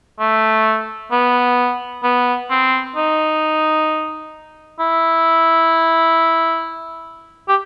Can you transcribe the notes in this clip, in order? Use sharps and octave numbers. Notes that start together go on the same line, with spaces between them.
A3
B3
B3
C4
D#4
E4
G4